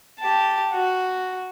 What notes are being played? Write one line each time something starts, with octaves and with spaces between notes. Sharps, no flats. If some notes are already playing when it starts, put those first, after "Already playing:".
G4 A5
F#4